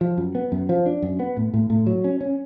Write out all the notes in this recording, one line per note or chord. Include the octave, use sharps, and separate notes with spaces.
F3
F#2
B3
F#2
F3
D4
F#2
B3
A2
A2
A2
F#3
C#4
C#4